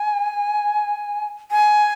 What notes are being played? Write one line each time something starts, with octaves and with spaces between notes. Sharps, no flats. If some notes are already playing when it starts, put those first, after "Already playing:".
Already playing: G#5
G#5